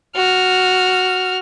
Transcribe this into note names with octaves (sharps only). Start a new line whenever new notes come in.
F#4 F6